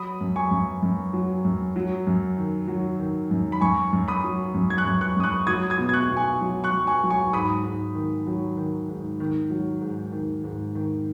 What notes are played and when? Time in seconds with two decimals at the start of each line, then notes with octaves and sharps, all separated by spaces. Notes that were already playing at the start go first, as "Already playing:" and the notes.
Already playing: F#3 B5 D#6
0.21 F#2
0.36 G#5 C#6
0.51 F#2
0.82 F#2
1.13 F#3
1.45 F#2
1.76 F#3
2.07 F#2
2.37 D#3
2.68 F#3
3.00 D#3
3.31 F#2
3.52 B5
3.61 F#2 G#5 C#6
3.93 F#2
4.08 B5 D#6
4.24 F#3
4.54 F#2
4.70 G#6
4.78 C#6 F#6
4.85 F#2
5.01 C#6 F#6
5.17 F#2 D#6
5.24 C#6 F#6
5.47 F#3 D#6 G#6
5.70 D#6 G#6
5.78 B2
5.89 G#6
5.93 C#6 F#6
6.09 B2
6.17 G#5 C#6
6.41 F#3
6.64 C#6 F#6
6.72 F#3
6.87 G#5 C#6
7.03 F#3
7.10 G#5 C#6
7.33 G#2 B5 D#6
7.64 G#2
7.95 D#3
8.27 F#3
8.57 D#3
8.89 G#2
9.20 D#3
9.50 F#3
9.81 G#2
10.12 D#3
10.44 G#2
10.75 D#3